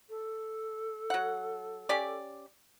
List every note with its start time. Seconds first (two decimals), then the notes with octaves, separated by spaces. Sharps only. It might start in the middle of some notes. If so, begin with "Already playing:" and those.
0.09 A4
1.10 F#3 F#5
1.89 C#4 G4 D5